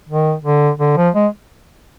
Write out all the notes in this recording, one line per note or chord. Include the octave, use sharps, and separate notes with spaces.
D#3
D3
D3
F3
G#3